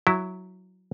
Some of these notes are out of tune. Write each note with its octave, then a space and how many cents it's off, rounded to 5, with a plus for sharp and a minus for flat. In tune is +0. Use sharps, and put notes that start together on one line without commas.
F#3 +0 E4 +0